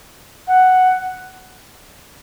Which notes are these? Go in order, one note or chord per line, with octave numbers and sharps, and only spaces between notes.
F#5